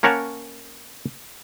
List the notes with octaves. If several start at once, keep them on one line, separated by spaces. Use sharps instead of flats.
A#3 C#4 A#4 C#5 F#5 A5